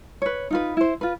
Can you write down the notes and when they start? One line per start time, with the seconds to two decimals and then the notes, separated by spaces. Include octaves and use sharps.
0.22 B4 C#5
0.50 D#4 F4 B4
0.77 E4 C5
1.01 F4 B4